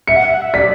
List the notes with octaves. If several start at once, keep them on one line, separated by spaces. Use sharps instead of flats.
E5 C#7
F#5
E5
F#5
E5
D5 B6